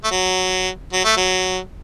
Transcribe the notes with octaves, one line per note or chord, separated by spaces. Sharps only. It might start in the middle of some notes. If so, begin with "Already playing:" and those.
A3
F#3
F#3
A3
F#3